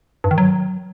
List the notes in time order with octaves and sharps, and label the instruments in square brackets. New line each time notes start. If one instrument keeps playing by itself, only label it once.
[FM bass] G2
D#3
F#3